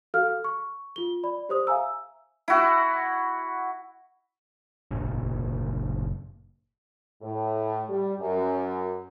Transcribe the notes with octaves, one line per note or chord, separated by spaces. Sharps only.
F#4 A4 F5 F6
C#6
F4 G7
D5 B5
G4 C5 D#6
E5 F5 G#5 A#5 E6
E4 F#4
F#1 A#2 A#3 D4
A2
G3
F#2